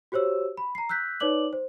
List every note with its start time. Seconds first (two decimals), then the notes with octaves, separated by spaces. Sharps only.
0.12 F#4 G4 C5 C#5 E6
0.57 B5
0.75 A#5 C7
0.89 E6 F#6 G6 B6
1.20 D#4 B4 C#5 D5 D6 F#7
1.53 C5